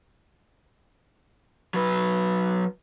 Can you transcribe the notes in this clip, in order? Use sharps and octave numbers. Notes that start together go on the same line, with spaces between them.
F#3 B4